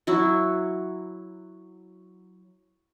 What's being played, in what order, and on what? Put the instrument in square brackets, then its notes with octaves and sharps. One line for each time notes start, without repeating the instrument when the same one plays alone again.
[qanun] F#3 E4 F#4